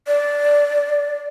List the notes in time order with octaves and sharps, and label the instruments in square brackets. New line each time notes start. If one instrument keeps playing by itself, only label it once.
[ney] D5